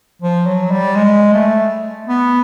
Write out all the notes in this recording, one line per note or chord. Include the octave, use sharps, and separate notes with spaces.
F3
F#3
G3
G#3
A3
B3